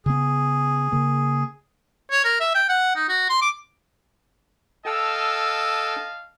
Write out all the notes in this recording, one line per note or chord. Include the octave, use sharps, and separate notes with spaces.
C#3 B3 G#4
C#3 A#3
C#5
A#4
E5
G5
F#5
D#4
F#4
C6
D6
A4 D#5 F5 G5 A5 E6